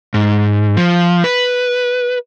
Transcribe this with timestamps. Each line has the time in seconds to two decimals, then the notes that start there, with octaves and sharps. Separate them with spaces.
0.14 G#2
0.77 F3
1.24 B4